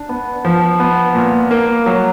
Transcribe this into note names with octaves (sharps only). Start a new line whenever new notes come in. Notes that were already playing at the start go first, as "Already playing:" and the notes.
Already playing: D4
B3
F3
B3
A#2
A#3
F#3